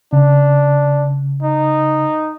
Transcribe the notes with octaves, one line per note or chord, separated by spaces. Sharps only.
C#3 D4
D#4